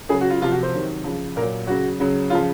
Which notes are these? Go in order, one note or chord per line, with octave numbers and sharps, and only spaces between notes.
C#3 F#3 G#4
F#4
F4
C3 F3 F4
F#4
C5
C3 D#3 F#3
C#3 F3
A#2 A#4
F#3
C#3 F#3 F#4
C#3 F#3
C#3 F3 F4